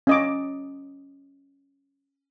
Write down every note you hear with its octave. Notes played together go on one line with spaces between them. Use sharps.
C#4 D#5 D6